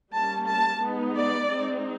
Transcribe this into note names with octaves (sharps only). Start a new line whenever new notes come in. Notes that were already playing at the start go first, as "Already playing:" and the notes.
G3 A#3 C#4 A5
A5
G#3 B3 D#4
D5
G#3 C4 D#4